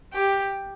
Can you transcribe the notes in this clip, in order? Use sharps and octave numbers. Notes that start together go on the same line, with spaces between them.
G4